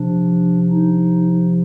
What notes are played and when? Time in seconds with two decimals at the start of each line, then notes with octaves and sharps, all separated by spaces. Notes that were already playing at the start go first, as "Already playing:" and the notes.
Already playing: C3 F3 D4
0.71 D#4